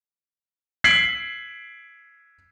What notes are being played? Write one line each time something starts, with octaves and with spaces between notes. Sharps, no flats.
G#6 B6 C7 D7 F#7